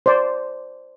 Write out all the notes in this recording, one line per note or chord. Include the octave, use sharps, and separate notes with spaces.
C5 D5